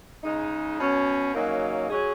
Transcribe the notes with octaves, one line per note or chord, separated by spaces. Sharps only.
C#3 G#3 D#4
B2 F#3 C#4
F#2 C#3 F#3 A#3 D#4
F#3 C#4 G#4